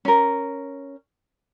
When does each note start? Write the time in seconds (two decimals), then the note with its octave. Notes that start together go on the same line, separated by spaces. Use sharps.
0.05 C#4 A#4